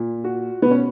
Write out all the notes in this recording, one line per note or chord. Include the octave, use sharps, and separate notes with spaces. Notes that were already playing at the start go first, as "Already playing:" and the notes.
Already playing: A#2
F#4
B2 B3
C#4